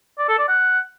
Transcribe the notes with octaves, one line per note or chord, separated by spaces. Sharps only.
D5
A4
D5
F#5